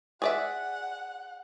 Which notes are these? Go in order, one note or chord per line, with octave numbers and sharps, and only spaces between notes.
G#4 D5 E5 F#5